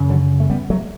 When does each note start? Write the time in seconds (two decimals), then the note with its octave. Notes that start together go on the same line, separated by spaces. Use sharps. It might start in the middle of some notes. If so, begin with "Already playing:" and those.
Already playing: F#2 C#3
0.09 D3 F#3
0.40 A3
0.50 G3 B3
0.70 F#3 A3